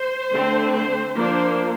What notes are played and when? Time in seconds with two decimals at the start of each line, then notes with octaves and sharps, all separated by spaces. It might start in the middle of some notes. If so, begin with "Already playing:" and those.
Already playing: C5
0.33 D3 A3 C4
0.75 C5
1.17 F3 A#3 D4 C5